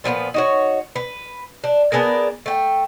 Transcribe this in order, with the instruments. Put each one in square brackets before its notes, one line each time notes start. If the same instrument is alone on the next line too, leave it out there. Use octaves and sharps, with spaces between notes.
[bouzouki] A#2 F3 A#3 B3
D#4 F#4 C#5
B4
D4
B3 D4 G#4 A#4
A3 G5